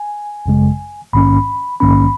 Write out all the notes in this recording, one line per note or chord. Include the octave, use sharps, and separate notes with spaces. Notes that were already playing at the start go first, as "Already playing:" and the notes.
Already playing: G#5
G#1 F#2 C#3 G#3
A#1 G#2 D#3 A#3 C#4 B5
A#1 G#2 D#3 A#3 C#4 B5